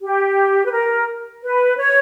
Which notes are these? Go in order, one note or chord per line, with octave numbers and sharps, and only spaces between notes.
G4
B4
A#4
B4
C#5